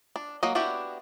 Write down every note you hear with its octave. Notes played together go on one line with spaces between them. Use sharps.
D4
F#3 A#3 F#4 D#5
B3 D4 E4 F#4 G4